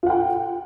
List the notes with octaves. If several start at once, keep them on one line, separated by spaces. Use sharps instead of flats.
F4 F#5 G5